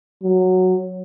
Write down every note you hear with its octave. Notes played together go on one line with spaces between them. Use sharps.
F#3